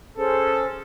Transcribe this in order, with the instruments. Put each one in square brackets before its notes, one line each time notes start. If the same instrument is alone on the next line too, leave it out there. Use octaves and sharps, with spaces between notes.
[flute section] C#4 G#4 C5 [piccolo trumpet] A4